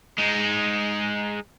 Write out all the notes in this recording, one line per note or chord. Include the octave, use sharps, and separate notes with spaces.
G#3 D#4